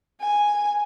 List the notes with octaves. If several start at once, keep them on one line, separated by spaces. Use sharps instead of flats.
G#5